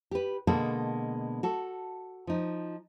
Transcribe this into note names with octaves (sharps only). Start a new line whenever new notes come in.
G4 B4
B2 D3 G#3 A#3 A4
F#4 A4
F3 D#4